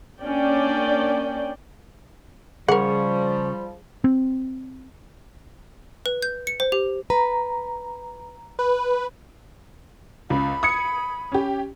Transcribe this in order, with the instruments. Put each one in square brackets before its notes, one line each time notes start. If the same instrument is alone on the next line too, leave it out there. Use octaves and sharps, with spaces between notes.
[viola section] A#3 C#4 D4 D5 G5
[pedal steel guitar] C#3 C#5 [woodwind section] F3 G3 [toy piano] G#4 [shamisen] A#4 F#5
[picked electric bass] C4
[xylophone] B4
G6
C#7
C5
G4
[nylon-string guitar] B4 [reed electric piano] A#5
[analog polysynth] B4
[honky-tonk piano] C#2 [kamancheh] B5
[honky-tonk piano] D#6 G#6 C#7
C#4 G4